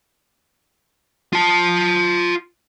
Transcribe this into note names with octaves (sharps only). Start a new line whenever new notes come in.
F4 A5